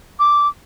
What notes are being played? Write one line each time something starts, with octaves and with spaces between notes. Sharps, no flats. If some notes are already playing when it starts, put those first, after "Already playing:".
D6